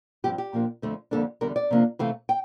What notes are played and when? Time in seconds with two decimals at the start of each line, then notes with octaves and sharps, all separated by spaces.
0.24 G2 F3 C4 G4
0.38 G4
0.53 A#2 F3 A#3 D4
0.82 F2 D3 A3 C4
1.11 F2 D3 G3 A#3 D4 A4
1.41 E2 D3 G3 A#4
1.56 D5
1.71 C3 F3 A#3 D4
1.99 C3 E3 A3 F5
2.29 G5